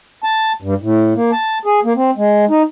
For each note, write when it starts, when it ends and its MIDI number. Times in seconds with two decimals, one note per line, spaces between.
0.24 0.52 81
0.62 0.74 43
0.82 1.13 45
1.15 1.31 58
1.32 1.58 81
1.65 1.80 68
1.85 1.93 58
1.96 2.11 60
2.17 2.45 56
2.50 2.62 63